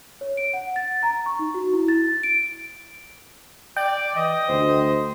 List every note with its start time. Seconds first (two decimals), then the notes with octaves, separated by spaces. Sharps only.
0.21 C#5
0.37 D7
0.53 F#5
0.76 A6
1.03 A#5
1.26 C#6
1.39 D#4
1.54 F#4
1.73 E4
1.88 A6
2.23 D7
3.77 D5 G5
4.16 E3 D#5
4.49 D2 C5